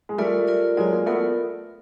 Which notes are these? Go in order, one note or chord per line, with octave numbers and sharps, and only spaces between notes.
G#3
G3 A3 F4 A#4 D5
F4 A#4 D5
F#3 G#3 F4 A#4 D5
G#3 A#3
A3 B3 F4 A#4 D5